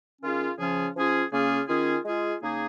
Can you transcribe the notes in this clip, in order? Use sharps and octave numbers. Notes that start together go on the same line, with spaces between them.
D#3 C#4 F4 G#4
C#3 F3 C#4 F4 G#4
F3 C#4 F4 G#4
C#3 A#3 C#4 F4 G#4
D#3 C#4 F4 G#4
G#3 F4 G#4
C#3 A#3 D#4 G#4